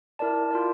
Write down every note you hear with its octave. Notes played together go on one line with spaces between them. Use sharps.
E4 A#4 D5 A5
F4 A#4 D5